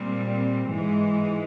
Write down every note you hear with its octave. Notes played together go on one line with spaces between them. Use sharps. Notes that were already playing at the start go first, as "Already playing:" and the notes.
Already playing: A#2 G3 C4
G#2 E3 G#3